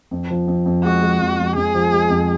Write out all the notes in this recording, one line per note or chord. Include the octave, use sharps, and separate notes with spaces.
F2
F3
F2
F2
G#3 F#4
G#3
F2
F2
F2 G#4
F3
G#3
F2